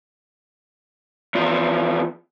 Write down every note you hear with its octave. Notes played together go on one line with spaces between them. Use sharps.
E2 F3